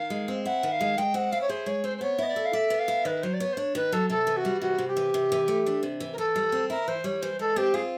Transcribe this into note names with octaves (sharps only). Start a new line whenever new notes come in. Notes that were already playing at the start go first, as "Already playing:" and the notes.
Already playing: D#3 F5
G#3
C4
E4 F#5
D#3
F5
G#3
G#3 G5
C4 F#5
E4 F5
C#5
G#4 C5
G#3 C#5
C4 C5
C5
B3 C#5
E4 D#5
D5
A4
F5
D5 E5
B3
F5
E4
D#3 B4
F#3 C5
D5
B3 C#5
C5
D4 C#5
D#3 B4
F#3 A4
C3 A4
E3
F#4
G3
C3 F#4
C3
G4
E3
C3
E3
A3
D4
C3
E3
A#4
E3 A4
G3
C4
E4 A#4
E3 C5
G3 C#5
E3 C5
G#3 A4
C4 G4
F4 G#4